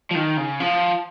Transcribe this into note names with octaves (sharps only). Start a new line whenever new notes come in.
F3
D#3
C#3
F3